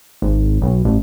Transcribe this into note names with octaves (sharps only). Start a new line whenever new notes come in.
G#1
B1
A1